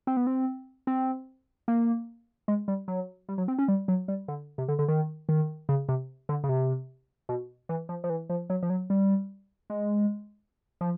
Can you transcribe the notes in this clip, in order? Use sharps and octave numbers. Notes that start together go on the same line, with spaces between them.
C4
B3
C4
C4
A#3
G#3
G3
F#3
G3
F#3
C4
C#4
G3
F#3
G3
D3
C3
D3
D3
D#3
D#3
C#3
C3
D3
C#3
C3
B2
E3
F3
F3
E3
F3
F#3
F3
F#3
G3
G#3
F3